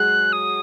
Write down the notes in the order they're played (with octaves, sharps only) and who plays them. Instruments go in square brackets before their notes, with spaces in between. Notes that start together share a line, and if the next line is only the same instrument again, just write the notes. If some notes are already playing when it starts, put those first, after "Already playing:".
Already playing: [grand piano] F#3 G#3 F#4 G#4 [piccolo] F#6
[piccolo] D#6